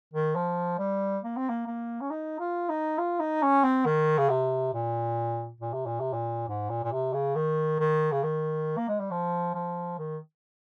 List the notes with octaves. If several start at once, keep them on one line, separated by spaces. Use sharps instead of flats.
D#3
F3
G3
A#3
C4
A#3
A#3
C#4
D#4
F4
D#4
F4
D#4
C#4
C4
D#3
C#3
C3
A#2
A#2
C3
A#2
C3
A#2
G#2
A#2
A#2
C3
C#3
D#3
D#3
C#3
D#3
A#3
G#3
G3
F3
F3
D#3